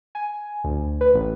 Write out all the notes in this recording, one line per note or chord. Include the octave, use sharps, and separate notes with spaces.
G#5
D2
B4
A1